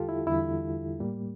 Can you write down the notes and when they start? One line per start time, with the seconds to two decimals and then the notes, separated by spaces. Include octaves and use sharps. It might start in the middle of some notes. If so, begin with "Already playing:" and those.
Already playing: E2 D3 G3 F4 G4 A4
0.09 E4
0.27 E2 D3 G3 E4
1.00 A2 G3 A#3